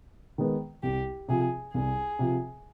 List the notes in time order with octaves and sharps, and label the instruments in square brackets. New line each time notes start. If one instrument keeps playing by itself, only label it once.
[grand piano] D#3 G#3 B3
[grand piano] C2 [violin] G4
[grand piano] C3 F3 [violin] G#4
[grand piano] C2 [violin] G#4
[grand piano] C3 F3